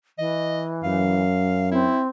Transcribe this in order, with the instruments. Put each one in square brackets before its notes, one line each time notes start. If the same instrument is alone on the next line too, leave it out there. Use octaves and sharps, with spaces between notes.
[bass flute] E3 [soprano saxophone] D#5
[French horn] F#2 [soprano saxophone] F5
[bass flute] C4 [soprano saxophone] E4